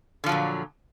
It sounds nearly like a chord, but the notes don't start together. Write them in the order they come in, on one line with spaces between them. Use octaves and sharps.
D3 F3 F#3 A#2